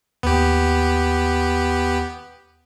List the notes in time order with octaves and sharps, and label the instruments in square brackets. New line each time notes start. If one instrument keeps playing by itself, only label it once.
[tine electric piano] D#2 [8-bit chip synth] B3 G4